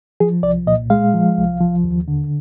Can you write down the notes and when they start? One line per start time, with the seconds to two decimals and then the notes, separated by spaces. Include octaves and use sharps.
0.20 F3 G#4
0.43 C2 D5
0.67 A#2 D#5
0.90 G#3 F5
1.14 F3
1.37 C2
1.60 F3
1.84 D#2
2.08 D3